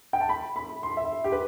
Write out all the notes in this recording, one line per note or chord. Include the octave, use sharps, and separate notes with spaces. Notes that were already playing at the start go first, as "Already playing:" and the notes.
G5
A5
B5
B5
C6
E5
G4
B4